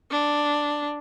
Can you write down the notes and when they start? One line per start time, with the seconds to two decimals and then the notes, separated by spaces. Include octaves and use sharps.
0.11 D4